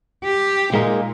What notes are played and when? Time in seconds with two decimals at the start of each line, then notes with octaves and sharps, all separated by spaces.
0.24 G4
0.74 A#2 G#3 A#3 D#4